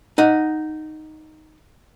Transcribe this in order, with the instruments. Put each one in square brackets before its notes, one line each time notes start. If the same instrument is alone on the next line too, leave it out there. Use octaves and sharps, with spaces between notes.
[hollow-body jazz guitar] D#4 F#5